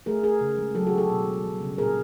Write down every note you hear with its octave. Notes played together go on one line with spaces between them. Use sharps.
A3 G#4 A#4
A3 G#4 A#4
C#3
G#3
F#3 G4 A4
F#4 G#4
D3
G4 A4
B2
G#3
G3
C#3
A#2 G#4 A#4